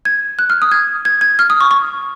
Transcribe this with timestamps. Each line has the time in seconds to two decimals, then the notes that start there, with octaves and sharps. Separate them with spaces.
0.05 G#6
0.39 F#6
0.50 F6
0.62 D#6
0.71 G#6
1.05 G#6
1.21 G#6
1.39 F6
1.50 D#6
1.60 C#6
1.71 C#6